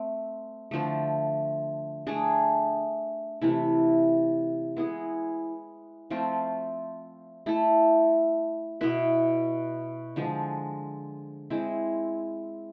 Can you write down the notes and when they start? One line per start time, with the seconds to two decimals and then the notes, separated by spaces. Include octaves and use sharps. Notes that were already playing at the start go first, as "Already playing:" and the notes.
Already playing: A3 C4
0.71 D3 F3 A3
2.07 A3 D4 G#4
3.41 C3 E3 A3 E4
4.76 G#3 B3 E4 G#4
6.10 F3 A3 C4 F4
7.46 A3 E4 A4
8.81 B2 B3 E4 B4
10.16 D3 F3 G#3
11.50 G#3 C4 E4